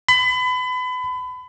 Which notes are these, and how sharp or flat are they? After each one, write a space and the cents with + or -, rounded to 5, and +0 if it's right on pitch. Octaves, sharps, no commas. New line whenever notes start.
B5 +30